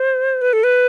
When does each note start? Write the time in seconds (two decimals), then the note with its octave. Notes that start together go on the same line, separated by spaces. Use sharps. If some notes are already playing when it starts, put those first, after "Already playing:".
Already playing: C5
0.41 B4
0.53 A4
0.63 B4